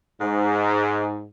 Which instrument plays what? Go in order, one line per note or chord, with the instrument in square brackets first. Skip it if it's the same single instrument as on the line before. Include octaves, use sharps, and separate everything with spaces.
[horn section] G#2